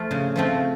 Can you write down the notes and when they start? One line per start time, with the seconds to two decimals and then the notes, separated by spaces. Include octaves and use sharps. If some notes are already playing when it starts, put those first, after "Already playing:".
Already playing: F3 A3 F4
0.11 C#3
0.36 F3 A3 C4 F4